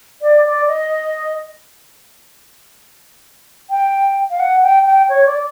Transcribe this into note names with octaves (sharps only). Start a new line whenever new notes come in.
D5
D5
D#5
G5
F5
F#5
G5
G5
C#5
D5